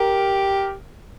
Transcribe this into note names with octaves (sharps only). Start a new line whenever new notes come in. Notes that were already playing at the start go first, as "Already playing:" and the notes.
Already playing: G4 A#4